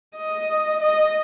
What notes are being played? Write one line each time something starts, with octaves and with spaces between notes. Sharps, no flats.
D#5
D#5